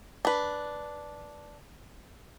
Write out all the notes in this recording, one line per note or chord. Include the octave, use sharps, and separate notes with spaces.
D4 B4